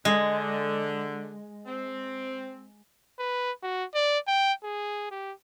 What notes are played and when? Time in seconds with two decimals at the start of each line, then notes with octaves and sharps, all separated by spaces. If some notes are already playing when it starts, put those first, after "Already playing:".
0.05 D3 G#3
1.66 C4
3.19 B4
3.63 F#4
3.94 D5
4.28 G5
4.64 G#4
5.11 G4